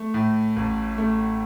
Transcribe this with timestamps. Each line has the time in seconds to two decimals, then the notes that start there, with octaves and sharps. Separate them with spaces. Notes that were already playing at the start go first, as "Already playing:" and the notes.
Already playing: A3
0.14 A2
0.56 A1
0.98 A3